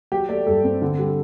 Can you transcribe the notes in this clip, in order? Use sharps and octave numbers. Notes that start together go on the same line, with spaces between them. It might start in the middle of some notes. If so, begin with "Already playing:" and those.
F#3 G4
A3 D5
G2 A4
C4
D3
G3